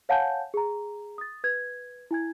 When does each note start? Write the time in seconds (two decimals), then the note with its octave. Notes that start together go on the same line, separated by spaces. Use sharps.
0.09 C#5 F5 F#5 G#5 A5 G6
0.54 G#4 A#5
1.18 D#6 A6
1.44 B4 G#6
2.11 E4 G#5 G#6